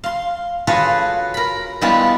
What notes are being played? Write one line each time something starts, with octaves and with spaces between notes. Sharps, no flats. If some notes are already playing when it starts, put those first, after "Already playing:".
F5 C6
F4 F#4 G#4 A4 B4 C#5
A#4 B5
G3 G#3 B3 E4 F4 G4